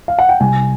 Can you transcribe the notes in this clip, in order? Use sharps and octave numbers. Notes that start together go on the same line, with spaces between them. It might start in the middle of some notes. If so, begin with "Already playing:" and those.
F5
F#5
G5
C2 G#5